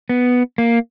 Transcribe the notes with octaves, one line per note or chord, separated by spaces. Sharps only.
B3
A#3